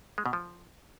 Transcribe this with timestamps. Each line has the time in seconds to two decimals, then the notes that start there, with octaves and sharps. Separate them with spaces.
0.18 G#3
0.26 B2
0.33 F3